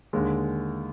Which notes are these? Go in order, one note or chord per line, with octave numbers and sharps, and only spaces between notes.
D#2 D3 G#3